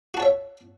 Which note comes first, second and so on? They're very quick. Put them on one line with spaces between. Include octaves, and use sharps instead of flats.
F#4 A5 C#5 E5